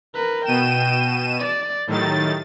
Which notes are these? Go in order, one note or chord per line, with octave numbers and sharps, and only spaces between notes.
A#4 B4
B2 G5 D#7 E7
D5
A2 D#3 F#3 G4 A6